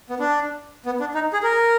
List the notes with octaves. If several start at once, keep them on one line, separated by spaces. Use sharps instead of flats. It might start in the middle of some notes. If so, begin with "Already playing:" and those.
B3
D4
B3
D4
D#4
G#4
A#4